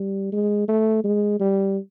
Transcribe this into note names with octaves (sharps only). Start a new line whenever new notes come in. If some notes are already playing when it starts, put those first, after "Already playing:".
Already playing: G3
G#3
A3
G#3
G3